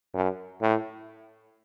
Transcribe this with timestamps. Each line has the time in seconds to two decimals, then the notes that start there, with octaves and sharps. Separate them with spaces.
0.14 F#2
0.61 A2